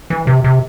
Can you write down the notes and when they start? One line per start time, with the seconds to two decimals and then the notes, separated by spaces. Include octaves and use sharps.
0.10 E3
0.27 C3
0.44 C3